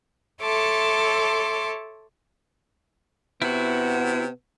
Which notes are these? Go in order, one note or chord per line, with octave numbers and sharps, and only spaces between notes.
A4 C#5 E5 A5 C6 D6
C3 B3 E4 F#4